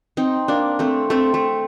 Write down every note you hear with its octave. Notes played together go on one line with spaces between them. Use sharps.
C4 D#4
A#3 D4
A3 C4
A3 C4
A3